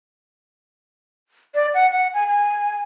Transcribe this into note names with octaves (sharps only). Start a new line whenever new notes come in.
D5
F#5
F#5
G#5
G#5